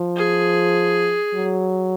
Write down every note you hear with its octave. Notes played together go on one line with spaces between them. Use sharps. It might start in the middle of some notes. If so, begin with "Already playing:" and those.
Already playing: F3
G#4
F#3